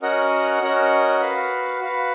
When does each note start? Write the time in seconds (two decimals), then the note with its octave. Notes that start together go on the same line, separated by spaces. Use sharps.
0.02 C#4 F#4 A#4 D#5 F#5
0.62 C#4 F#4 A#4 D#5 F#5
1.21 F#4 B4 F5
1.81 F#4 B4 F5